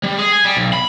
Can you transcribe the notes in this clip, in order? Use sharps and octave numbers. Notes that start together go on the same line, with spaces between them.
G3
G#4
G#5
G3
B1
B5